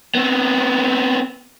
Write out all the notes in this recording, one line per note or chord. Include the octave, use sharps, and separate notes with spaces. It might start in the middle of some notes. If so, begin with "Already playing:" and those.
B3 C4